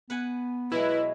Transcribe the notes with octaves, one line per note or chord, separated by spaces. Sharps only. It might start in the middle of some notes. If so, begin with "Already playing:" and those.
B3 B4 F#5 G#5
B2 F#3 G#3 E4 B4